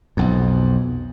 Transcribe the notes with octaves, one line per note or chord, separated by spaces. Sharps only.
B1 F2